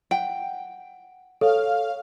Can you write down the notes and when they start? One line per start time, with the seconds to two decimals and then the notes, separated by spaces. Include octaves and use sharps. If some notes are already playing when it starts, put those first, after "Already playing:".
0.11 F#5 G5
1.41 A4 C#5 F5